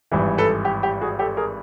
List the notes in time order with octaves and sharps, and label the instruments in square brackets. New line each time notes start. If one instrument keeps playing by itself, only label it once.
[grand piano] G#1 G2 E3
A4 B4
G4
G4
F#4 G#4
G4 A4
G#4 A#4